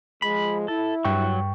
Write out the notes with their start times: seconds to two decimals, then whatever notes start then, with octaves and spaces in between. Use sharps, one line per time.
0.22 F3 G#3 B5
0.68 E4 A4
1.04 G2 F#3 G5 C#6